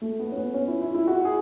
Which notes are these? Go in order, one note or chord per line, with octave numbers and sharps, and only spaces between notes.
A3
B3
C#4
B3
C#4
E4
E4
E4
F#4
G#4